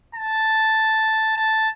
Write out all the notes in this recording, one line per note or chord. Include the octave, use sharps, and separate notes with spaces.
A5
A5